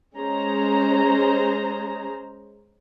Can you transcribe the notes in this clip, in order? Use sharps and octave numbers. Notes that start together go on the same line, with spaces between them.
G#3 C#4 G#4 C5 A#5